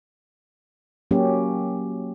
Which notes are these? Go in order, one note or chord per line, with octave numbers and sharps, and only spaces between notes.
F#3 A#3 C#4 G4